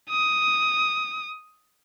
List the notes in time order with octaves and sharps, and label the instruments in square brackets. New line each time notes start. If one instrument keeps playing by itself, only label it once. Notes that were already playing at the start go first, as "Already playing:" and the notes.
[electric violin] D#6